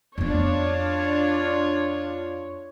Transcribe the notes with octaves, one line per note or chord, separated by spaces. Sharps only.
F2 B3 D4 F4 C#5